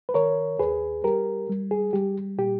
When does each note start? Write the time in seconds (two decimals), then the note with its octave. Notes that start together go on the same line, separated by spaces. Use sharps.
0.09 B4
0.14 D#3 A#4 C#5
0.59 D#2 G#4 B4
1.04 G3 G4 A#4
1.50 G3
1.71 G#4
1.93 G3 G4
2.38 A#2 G4